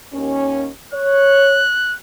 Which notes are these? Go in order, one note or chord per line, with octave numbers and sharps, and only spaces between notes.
D#2 C#4
C#5 F#6